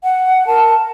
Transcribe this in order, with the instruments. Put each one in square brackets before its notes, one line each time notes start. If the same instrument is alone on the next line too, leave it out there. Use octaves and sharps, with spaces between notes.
[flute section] F#5
A#4 A5